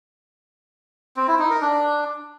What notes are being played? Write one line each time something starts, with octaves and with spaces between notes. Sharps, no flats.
C4
E4
D#4
A#4
D4